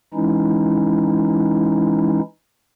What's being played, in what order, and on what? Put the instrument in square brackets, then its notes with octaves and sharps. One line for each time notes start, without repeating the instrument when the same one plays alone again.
[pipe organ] E3 G#3 C#4 D#4 E4